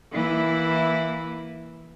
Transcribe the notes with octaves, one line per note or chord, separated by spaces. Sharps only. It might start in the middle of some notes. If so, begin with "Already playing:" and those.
E3 A#3 E4